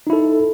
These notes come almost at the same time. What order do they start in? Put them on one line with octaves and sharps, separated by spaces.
D#4 E4 A4